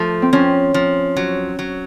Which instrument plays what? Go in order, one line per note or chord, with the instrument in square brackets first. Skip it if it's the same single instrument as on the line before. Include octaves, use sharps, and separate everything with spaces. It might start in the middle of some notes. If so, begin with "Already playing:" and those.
Already playing: [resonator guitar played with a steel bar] F3 A3
[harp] C4
[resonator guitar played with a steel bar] F3 [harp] C#4
[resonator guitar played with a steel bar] F3
F#3
F#3